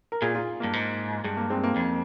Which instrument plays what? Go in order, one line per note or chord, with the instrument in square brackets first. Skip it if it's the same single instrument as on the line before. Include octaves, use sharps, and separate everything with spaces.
[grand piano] A#4
[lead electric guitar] A#2 [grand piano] F4 G#4
[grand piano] F4 G#4
[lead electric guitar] G2 [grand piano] A#3
[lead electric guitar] G#2
[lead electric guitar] G2 [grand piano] G#3
[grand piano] A#3
G#3 C4
A#3
[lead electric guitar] F2